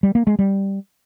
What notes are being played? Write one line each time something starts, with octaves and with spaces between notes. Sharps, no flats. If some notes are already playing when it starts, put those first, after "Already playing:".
G3
A#3
G#3
G3